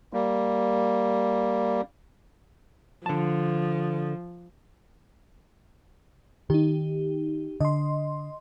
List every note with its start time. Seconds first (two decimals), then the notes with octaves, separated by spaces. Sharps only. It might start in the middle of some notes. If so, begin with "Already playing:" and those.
0.13 G3 A#3
3.06 D3 F3 A5
6.50 D#3 D#4 G4
7.60 D3 D#5 C6